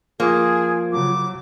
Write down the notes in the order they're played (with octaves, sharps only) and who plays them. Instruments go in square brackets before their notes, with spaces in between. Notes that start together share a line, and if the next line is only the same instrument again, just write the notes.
[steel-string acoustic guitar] F3 [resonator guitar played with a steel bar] A#3 [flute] G#4
[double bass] C#3 F#3 [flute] D6